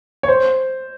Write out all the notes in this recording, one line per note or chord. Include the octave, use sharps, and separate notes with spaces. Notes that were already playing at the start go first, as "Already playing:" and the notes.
C#5
C5